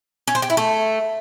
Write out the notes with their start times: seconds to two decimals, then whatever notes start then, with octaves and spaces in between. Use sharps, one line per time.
0.28 C#4
0.35 C5
0.42 G4
0.50 E4
0.57 A3